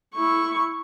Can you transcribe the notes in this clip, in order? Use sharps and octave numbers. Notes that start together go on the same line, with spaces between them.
E4 C#6